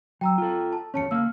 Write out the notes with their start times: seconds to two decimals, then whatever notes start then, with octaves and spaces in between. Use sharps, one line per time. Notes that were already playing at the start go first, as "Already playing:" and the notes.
0.21 F#3 G5 A#5 E6
0.38 F4 A4
0.73 A5
0.94 E2 G#2 C#4 C#5 A5 C#7
1.11 C#2 A#3 F5 E6 F6